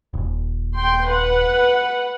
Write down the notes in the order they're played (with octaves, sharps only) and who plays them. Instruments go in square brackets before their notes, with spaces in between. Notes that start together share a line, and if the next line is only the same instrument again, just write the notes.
[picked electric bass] D#1
[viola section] G5 C6
B4 F#5